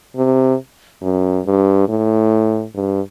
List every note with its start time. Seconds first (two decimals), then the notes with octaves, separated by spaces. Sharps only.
0.16 C3
1.02 F#2
1.46 G2
1.89 A2
2.75 G2